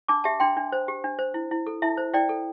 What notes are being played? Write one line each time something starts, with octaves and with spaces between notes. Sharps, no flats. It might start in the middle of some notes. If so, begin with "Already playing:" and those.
D4 A5 D6
G4 E5 A5
D4 G5 C6
D4
C5
G4
D4
C5
E4
E4
A4
E4 E5 A5
C5
E4 D5 G5
A4